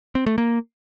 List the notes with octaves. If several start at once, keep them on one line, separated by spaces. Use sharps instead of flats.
C4
A3
A#3